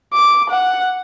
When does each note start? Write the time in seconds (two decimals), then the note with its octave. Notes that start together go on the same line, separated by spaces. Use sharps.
0.13 D6
0.50 F#5